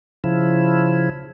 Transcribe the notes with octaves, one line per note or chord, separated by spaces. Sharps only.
C#3 F3 E4